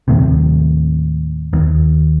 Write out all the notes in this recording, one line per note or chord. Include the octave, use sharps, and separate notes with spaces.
D#2 A2 C3
D#2